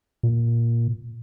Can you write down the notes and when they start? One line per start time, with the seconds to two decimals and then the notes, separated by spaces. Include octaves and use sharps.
0.23 A#2